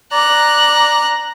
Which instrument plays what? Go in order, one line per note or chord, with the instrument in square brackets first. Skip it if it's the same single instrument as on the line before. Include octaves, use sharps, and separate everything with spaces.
[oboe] D5 [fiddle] A#5 F#6